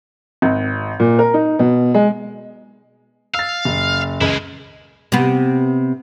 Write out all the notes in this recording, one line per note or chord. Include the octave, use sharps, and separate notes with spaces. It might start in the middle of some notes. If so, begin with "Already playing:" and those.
G#1
A#2
A#4
D#4
B2
G#3
F5 E6 A6
F#1
C#2 G#3 E4
C3 B3